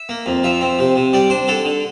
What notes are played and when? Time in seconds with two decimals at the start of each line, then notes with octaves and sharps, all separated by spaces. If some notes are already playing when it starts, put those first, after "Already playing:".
Already playing: E5
0.09 A#3
0.26 F2
0.43 F3 E5
0.61 C4
0.79 C3
0.96 C3
1.13 G3 D5
1.30 D4 C5
1.48 D3 A4
1.65 D3